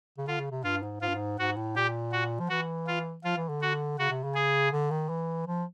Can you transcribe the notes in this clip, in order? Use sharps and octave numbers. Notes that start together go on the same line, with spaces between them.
C#3
D3 F4
C#3
C3
G2 F4
G#2
G#2 F4
G2
G#2
G#2 F#4
A2
A#2 G4
F#4
F3
E3 F#4
F4
F3 F4
E3
D3
F#4
C#3 F#4
C3
C#3
G#4
D3
D#3
E3
F3